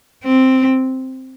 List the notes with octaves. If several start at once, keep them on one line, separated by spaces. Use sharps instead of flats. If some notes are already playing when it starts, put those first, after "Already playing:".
C4